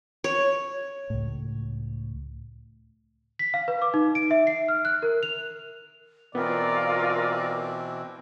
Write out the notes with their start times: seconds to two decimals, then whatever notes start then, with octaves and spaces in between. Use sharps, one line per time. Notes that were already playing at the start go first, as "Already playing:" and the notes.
0.24 C#5
1.10 C#2 A2
3.39 B6
3.54 F5
3.68 B4
3.82 D6
3.94 D#4
4.15 D7
4.31 E5
4.47 C7
4.68 F6
4.85 F#6
5.02 A#4
5.23 F7
6.35 B2 E3 B3 C4 F4 A#4 D5